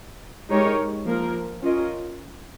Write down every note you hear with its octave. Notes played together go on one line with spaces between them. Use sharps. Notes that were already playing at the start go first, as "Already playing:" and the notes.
G#3 D#4 G4 A#4 C#5
F3 A#3 F4 A#4
C#4 F4 A#4 D#5